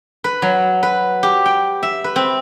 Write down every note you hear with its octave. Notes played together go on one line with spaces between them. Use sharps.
B4
F#3
B4
G4
G5
E5
B4
C4